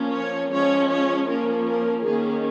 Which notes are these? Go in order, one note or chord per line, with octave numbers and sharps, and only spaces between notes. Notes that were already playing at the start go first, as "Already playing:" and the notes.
Already playing: F3 A#3 C#4
C#5
F3 G#3 C#4 C#5
C#5
F3 A#3 C#4 A#4
A#4
D#3 A#3 C#4 G#4